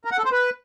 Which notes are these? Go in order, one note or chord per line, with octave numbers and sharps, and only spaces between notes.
A#4
F#5
A4
C5
B4